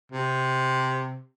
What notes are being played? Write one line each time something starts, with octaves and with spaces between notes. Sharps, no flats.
C3